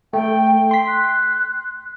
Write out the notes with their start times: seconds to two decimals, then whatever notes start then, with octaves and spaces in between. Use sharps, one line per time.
0.13 A3 G5
0.71 C6 B6 C7
0.87 F#6